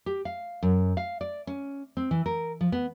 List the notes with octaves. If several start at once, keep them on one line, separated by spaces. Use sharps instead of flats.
G4
F5
F#2
F5
D5
C#4
C4
E3
A#4
F3
B3